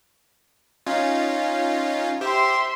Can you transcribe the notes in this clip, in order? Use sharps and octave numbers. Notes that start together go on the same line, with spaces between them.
C#4 D#4 F4
G4 C5 E5 C6